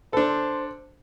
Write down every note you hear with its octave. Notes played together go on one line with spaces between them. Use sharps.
D4 A4 C5